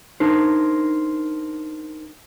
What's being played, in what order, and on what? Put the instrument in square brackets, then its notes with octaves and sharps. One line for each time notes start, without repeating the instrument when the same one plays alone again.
[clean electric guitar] D4 D#4 A#4 C5